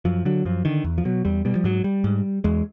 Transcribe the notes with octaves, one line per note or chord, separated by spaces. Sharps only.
F#2 F3
D3 F#3
F#2 F3
D3 D#3
E2
F3
B2 F#3
E2 G3
B2 G3
F3
G#2 F#3
G3
G#2
E2 G#3